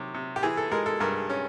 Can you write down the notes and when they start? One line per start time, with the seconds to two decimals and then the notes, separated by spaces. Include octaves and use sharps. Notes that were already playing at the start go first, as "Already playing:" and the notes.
Already playing: C3 D#3 F#3
0.14 C3
0.36 G4
0.43 E3 G#4
0.57 A4
0.71 G#3 A#4
0.86 A4
1.00 G2 A#4
1.30 C#4